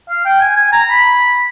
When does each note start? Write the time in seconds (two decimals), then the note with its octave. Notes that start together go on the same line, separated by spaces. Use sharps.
0.10 F5
0.25 G5
0.41 G#5
0.56 G#5
0.72 A#5
0.89 B5